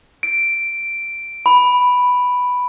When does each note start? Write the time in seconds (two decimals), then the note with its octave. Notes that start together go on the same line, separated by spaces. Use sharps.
0.23 D7
1.46 B5